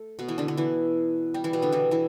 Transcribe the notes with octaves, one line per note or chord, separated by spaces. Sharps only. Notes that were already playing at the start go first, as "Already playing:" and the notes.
Already playing: A3
B2 B3
E3 E4
D3 D4
D3 D4
E3 E4
G3 G4
E3 E4
B2 B3
D3 D4
E3 E4
E3 E4